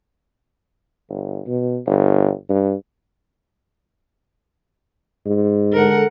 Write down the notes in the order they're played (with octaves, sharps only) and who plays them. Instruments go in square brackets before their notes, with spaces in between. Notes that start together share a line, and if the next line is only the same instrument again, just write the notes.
[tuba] G1
B2
G1
G2
G#2
[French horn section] D3 G#3 A4 [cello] A#4 F#5